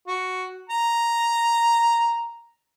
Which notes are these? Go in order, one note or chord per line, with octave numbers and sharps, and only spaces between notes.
F#4
A#5